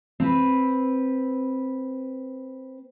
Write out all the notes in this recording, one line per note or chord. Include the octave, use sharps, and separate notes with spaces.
C4 B4